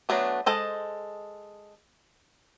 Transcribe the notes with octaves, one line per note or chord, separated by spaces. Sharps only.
F#3 A3 B3 D4
G#3 A4 C5 D#5